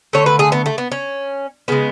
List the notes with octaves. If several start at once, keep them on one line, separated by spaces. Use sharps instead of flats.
D3 A3 C#5
B4
G#4
B3
A3
B3
C#4
C#3 G#3 B3